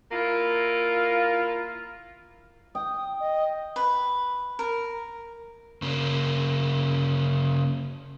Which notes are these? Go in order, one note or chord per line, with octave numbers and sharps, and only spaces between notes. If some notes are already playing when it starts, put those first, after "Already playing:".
A#3 E4 F4
G5 D#6
D#5
B4
A#4
C#3 A#3